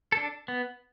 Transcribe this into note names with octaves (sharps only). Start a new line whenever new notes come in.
D4 A4
B3